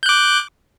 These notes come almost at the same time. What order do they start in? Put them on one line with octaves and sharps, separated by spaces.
G6 F#6 D6